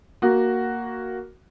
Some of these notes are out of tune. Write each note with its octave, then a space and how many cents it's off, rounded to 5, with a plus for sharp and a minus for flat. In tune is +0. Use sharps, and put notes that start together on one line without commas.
A#3 +0 F#4 +5